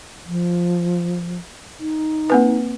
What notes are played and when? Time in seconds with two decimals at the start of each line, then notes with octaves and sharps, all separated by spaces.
0.27 F3
1.80 D#4
2.30 A#3 C4 B4